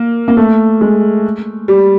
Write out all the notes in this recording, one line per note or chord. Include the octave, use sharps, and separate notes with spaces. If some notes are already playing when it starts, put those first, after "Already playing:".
Already playing: A#3
A#3
A3
G#3
G3